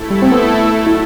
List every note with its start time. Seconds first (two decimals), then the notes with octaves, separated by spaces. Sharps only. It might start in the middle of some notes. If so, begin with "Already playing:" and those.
Already playing: A3 E4 A4
0.11 G3
0.22 C4
0.32 B3
0.74 F#3 A3
0.87 E4